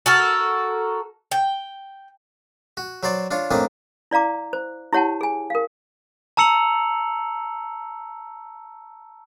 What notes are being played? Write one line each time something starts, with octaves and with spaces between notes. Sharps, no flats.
F#4 A4 A#4
G5
F#4
F#3 F#4 C5 D5
D4 F4 C#5
A2 A#3 C4 D4 D#4 G#5
E4 D5 F5 A#5 D6
C5
E4 G4 C#5 F#5 G5 A5
G#4 G#5
A#4 F5
A5 A#5 E6 C#7 F7 F#7